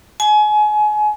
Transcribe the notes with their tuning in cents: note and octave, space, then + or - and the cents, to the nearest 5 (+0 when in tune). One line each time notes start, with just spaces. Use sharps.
G#5 +30